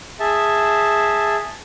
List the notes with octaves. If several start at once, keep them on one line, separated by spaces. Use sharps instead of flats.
G#4 E5 A5